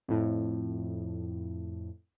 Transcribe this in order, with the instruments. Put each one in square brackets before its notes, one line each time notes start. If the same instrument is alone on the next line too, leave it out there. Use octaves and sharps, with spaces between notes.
[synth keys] F2 A2